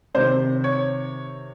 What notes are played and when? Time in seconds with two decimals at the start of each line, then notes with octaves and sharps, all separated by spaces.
0.14 C3 D#3 C5
0.64 C#5